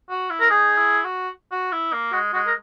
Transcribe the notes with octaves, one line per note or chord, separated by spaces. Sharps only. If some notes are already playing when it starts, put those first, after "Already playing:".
F#4
E4
A#4
D#4 G#4
E4
F#4
F#4
E4
A#3
G#3 F#4
G#3 F#4
A#4